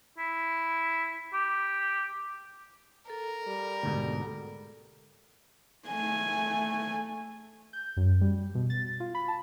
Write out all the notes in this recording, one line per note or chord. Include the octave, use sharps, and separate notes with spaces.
E4
G4
A4 A#4
G3
D2 G#2 B2
A3 G#5
G6
F#2
G3
B2
A6
F4
B5
A5